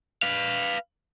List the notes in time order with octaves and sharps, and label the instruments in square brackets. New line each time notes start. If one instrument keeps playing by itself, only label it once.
[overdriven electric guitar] B4 F5